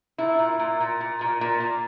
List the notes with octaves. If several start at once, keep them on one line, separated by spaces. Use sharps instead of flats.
A#2 E4
A#2
A#2
A#2
A#2
A#2
A#2
A#2